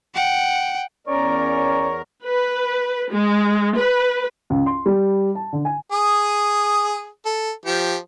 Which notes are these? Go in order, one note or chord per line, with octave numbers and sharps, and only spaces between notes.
F#5 G5
E2 C#4 A#4 C#5 D5
B4
G#3
B4
C#2
C6
G3
A5
D3
G#5
G#4 D#6
A4
F3 G4